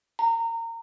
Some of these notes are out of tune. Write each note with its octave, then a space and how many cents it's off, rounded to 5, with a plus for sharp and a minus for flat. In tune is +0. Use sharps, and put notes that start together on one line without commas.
A#5 -25